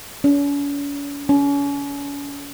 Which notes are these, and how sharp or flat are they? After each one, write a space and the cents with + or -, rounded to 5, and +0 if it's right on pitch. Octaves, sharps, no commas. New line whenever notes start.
C#4 +45
C#4 +35